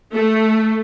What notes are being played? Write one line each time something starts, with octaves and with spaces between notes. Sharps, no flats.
A3